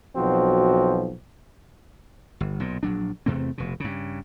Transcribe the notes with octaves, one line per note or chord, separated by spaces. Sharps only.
B1 F3 C4 F#4
G1
B1 A#2
A#1 F#3 D4
E2 C3 A3 C4
F1 B2
G2 C#3